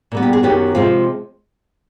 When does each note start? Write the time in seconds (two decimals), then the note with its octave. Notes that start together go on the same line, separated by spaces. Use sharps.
0.12 A#2 G3 B3
0.23 G4
0.33 G#4
0.43 F#2 D#3 F#3 B3 G4
0.75 C3 F3 G#3 C4 F4